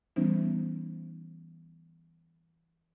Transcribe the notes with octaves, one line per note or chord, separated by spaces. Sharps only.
E3 G3 B3 C#4 D#4 C5